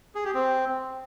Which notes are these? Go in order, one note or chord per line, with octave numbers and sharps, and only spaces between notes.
G#4
G4
C4